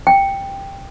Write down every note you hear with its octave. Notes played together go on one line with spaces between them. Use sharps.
G5